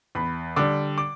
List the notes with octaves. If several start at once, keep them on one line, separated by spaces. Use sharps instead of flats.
E2 B5
D3 G3 D6
D6